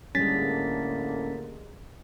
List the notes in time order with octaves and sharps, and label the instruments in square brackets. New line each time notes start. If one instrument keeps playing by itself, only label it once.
[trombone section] A2 D3 A#3 [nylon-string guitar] G3 G#3 [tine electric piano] C#4 A6 B6